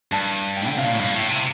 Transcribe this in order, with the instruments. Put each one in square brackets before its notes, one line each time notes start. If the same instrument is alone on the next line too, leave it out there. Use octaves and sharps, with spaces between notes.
[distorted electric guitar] G2 [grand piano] A5
[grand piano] G5
[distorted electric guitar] D3
[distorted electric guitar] C3 [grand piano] F5
[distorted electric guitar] A#2
A2
[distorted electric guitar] G2 [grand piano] F5
[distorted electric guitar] A2
C3